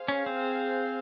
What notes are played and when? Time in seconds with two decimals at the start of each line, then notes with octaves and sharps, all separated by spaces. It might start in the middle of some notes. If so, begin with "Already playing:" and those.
Already playing: G#4 C5 F5
0.08 C#4
0.26 C4